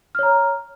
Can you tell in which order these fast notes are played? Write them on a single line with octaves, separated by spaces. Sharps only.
F6 C#5 A#5